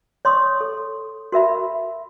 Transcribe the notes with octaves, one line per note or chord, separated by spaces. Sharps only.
C#5 C6 C#6 D#6
A4
F#4 A#4 E5 B5